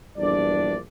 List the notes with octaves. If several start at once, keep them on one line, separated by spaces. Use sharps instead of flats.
A#1 E2 G2 D4 D5